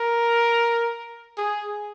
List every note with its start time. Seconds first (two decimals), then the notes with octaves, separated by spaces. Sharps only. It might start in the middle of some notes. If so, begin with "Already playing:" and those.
Already playing: A#4
1.38 G#4